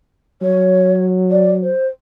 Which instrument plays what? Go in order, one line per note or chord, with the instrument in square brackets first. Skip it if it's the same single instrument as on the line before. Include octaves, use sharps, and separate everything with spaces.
[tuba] F#3 [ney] C#5
[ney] D5
C5